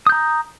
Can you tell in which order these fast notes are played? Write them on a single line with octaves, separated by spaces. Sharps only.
D#6 G6 A#5